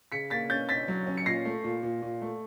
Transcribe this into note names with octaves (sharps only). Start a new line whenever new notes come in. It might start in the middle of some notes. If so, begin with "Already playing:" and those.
C#3 B6 C#7
A#3 A6 B6
C#4 G6 A6
C#4 A6 B6
F#3
C#4
C#7
A#2 A#6 C7
A3
A#2
A#2
A#2
A3